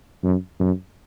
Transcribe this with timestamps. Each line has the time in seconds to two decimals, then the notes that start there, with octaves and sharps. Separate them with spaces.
0.24 F#2
0.60 F#2